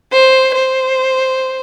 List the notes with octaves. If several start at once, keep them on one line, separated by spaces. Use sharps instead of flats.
C5
C5